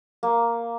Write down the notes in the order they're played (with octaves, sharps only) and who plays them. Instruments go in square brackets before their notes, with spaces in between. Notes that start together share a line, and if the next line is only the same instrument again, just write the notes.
[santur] A#3